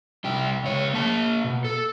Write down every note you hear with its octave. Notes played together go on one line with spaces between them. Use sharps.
C2 G4
C#2 C#5
A#3 A5
B2
A4